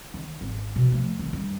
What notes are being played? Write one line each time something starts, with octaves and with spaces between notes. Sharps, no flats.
D#3
G#1
B2
F3 A3
D#3
G2